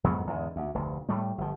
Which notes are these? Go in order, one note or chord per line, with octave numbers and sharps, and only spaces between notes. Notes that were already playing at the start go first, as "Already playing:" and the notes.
F2 G#2 F#3 B3
E2 G#2 D3
D2
F1 D2
A2 G3 A3
G1 F3